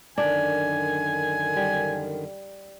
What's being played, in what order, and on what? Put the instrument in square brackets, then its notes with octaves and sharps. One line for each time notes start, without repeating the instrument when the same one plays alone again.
[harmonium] F#2 D3 D#3 [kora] D4 [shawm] G#5
[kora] G3